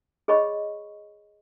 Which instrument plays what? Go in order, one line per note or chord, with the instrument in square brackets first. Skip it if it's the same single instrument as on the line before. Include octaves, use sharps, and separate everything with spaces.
[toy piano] G#4 C#5 D#5 B5 C#6